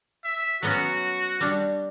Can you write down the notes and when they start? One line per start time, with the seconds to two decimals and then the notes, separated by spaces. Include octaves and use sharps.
0.24 E5
0.62 F#3 B3 C#4 F#4
1.41 G3 D4